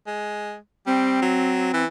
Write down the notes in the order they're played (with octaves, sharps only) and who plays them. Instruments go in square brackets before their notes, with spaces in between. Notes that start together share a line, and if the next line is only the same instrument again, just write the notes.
[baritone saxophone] G#3
[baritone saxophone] G3 [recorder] C4
[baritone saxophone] F#3
E3